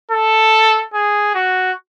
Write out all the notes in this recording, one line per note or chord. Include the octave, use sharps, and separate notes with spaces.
A4
G#4
F#4